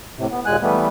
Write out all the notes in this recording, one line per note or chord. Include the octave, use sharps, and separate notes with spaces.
A2 C3
B3
D#2 A#2 G#3 G#5 F#6
E3 G3 A3 B3